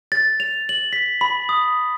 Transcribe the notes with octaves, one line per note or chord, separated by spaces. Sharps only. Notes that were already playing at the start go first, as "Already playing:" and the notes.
A6
F7
F#7
B6
B5
D#6